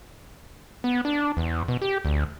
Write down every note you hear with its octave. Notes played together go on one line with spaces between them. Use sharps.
B3
D4
E2
B2
G4
D2